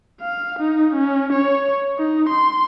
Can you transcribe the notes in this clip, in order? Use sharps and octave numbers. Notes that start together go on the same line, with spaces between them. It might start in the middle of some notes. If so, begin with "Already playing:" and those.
F5
D#4
C#4
C#5
D#4
C6